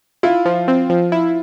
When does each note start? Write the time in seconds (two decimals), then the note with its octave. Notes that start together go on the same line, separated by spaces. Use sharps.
0.23 E4 F4
0.45 F3
0.68 C4
0.90 F3
1.12 E4